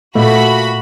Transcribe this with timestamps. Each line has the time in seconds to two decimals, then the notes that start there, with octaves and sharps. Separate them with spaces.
0.15 A#2 A3 F#4 B5